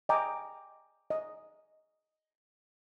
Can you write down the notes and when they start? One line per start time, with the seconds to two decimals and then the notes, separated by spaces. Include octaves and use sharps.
0.09 D#5 G5 G#5 A#5 D6
1.10 D#5